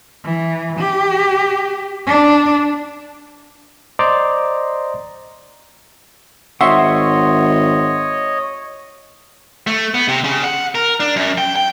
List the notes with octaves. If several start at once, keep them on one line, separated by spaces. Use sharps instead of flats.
E3
G4
D4
C5 D5 D#5 A#5 C6 D6
G#1 C#5 D#5 E5 F#5 C6 C#6
A3
B3
C3
C#3
F#5
A#4
D4
F#2
G5
G5